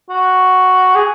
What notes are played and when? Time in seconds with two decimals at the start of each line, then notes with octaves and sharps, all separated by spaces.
0.09 F#4
0.95 G#4